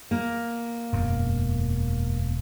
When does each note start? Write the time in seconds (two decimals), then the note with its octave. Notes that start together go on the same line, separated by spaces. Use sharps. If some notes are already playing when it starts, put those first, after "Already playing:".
0.11 A#3
0.92 E1 F#2